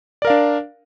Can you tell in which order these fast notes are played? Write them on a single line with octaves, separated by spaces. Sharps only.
D5 A#4 F5 D4